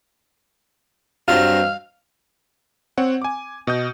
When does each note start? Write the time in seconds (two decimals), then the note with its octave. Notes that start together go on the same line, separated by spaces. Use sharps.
1.28 G2 F#3 C4 F5
2.98 C4 C#5 F#5
3.22 G#5 D6
3.67 B2 D#5 D#6 G6